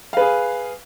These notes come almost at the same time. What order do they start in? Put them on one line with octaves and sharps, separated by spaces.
F5 B4 G#4